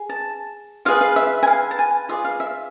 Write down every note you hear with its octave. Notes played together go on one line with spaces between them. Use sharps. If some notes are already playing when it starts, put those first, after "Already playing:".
Already playing: G#4
A5
F4 G#4 B4 F5
F5
E5
G#5
F5
A5
G#5
F4 G#4 D5 E5
F5
E5